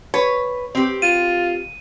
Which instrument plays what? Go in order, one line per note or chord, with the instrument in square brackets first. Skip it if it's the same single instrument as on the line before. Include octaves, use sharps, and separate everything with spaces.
[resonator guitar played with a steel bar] B4 [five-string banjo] C#5
[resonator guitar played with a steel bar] C4 G4
[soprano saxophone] F4 [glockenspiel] D#7